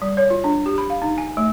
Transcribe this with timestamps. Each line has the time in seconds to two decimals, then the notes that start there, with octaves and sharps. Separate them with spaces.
0.02 G3
0.17 C#5
0.30 F4
0.44 D4
0.66 G4
0.78 B5
0.90 F5
1.02 D#4
1.18 G#5
1.37 A3